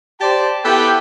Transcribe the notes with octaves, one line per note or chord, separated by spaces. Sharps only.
G4 C5 D5 A5
B3 E4 G4 A4 B4 G5